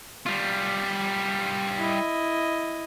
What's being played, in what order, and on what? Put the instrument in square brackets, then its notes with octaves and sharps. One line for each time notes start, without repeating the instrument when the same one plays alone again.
[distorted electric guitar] G3 F4
[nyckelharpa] E4 D#5